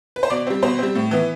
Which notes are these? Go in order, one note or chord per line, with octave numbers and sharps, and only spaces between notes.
B4
C5
B2 D5
G3 C4
B2 C5
G3 C4
A2
E3 B3